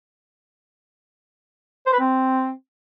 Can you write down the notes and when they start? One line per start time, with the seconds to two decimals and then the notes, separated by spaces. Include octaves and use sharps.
1.86 C5
1.93 B4
2.00 C4